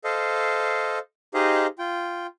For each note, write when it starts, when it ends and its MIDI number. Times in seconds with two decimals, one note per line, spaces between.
0.04 0.99 69
0.04 0.99 72
0.04 0.99 75
0.04 0.99 77
1.34 1.67 63
1.34 1.67 67
1.34 1.67 68
1.34 1.67 72
1.34 1.67 75
1.34 1.67 77
1.79 2.27 65
1.79 2.27 79